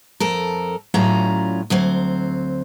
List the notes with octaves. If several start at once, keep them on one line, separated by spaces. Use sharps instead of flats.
F2 A4 A#4
A2 F#3 C#4 F4 D5 A#5
D2 F#3 C4 C5